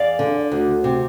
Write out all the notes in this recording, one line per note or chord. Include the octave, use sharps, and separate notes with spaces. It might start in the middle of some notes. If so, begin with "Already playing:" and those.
Already playing: E2 D5 F5
D3
D2
C3